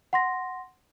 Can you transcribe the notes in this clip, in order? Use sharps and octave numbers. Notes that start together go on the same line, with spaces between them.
F#5 C6 A#6